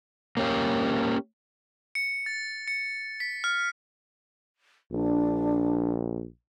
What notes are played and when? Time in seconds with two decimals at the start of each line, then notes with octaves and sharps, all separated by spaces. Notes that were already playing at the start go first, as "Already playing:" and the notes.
0.37 A#3 C#4 G4 F5
1.95 C#7
2.26 A6
2.68 C#7
3.20 B6
3.44 F6
4.92 A#1 D4